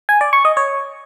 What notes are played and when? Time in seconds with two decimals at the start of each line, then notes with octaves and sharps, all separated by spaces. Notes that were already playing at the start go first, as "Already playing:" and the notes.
0.09 G#5
0.21 D5
0.33 C#6
0.45 D#5
0.57 C#5